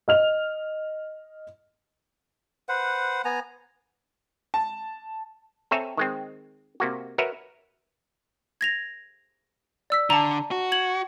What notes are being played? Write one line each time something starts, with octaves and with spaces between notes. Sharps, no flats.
D#5 F6 F7
B4 C5 F#5
B3 G#5 A#5
A5
C4 A4 C#5 E5 G#5 A#5
D#3 G#3 C4
C3 A#3 F#4
F#4 A#4 B4 C#5 E5
G#6 A#6 F7
D5 E6 B6
D3 A5 A#5
F#4
G#6 F#7